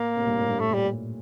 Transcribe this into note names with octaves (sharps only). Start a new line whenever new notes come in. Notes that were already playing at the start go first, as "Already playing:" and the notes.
Already playing: A2 A#3
A2 C3
G2 A#2
A2
G2
A2 A3
A#2
G3